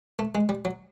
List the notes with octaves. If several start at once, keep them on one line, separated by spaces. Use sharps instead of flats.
A3
G#3
G3
F#3